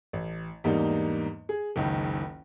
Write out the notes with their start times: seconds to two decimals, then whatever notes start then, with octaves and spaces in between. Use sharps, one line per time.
0.13 A1
0.64 E2 G#2 G3 A#3 D4 D#4
1.49 G#4
1.76 F#1 C#2 D#3